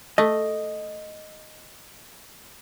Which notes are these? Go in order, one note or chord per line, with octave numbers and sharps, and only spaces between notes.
A3 D#5